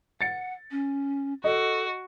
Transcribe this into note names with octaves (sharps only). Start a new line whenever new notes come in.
F#5 A6 C#7
C#4
F#4 A4 D#5